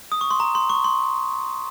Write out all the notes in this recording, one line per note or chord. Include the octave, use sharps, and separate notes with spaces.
D#6
C#6
C6
A#5
C6
C#6
C6